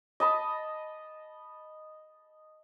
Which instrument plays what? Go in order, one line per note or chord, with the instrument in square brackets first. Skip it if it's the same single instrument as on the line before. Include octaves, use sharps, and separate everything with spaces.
[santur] D#5 A5 B5